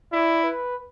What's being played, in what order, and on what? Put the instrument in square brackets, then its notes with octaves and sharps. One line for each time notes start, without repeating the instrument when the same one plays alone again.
[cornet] E4 [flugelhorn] D5
[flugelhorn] B4